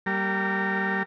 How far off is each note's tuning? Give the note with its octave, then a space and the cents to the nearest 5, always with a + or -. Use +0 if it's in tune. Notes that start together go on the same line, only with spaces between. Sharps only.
G3 -20 A#3 +0 A#4 -25